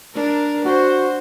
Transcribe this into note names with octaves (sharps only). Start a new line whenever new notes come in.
D4 A#4
F#4 C5